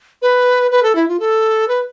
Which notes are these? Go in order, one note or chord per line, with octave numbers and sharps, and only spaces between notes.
B4
B4
A4
E4
F4
A4
B4